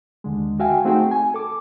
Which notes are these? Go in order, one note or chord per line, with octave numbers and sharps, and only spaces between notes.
D#2 D3 G#3
F#4 E5 F5 G5 G#5
A3 C4 D#4 F#4 G#4 G5
G#5
A4 D6